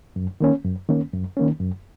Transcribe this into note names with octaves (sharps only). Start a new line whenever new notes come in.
F#2
D#3 A#3 C#4
F#2
D#3 A#3 C#4
F#2
D#3 A#3 C#4
F#2